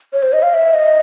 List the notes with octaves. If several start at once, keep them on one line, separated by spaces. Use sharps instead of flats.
C#5
C5
D#5
F5
E5
D#5